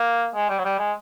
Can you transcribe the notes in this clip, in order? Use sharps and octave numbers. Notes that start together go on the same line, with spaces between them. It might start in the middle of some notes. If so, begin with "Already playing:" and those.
Already playing: A#3
G#3
G3
F#3
G3
G#3